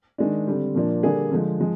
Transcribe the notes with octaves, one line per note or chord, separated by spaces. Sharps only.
D#3 G#3 D4
D3 G3 C4
A#2 F3 A#3 D4
D3 G3 A#3 D4 G#4
D3 F3 G#3
F3 G#3